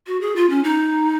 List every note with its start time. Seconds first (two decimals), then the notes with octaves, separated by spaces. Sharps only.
0.07 F#4
0.21 G#4
0.36 F4
0.50 C#4
0.64 D#4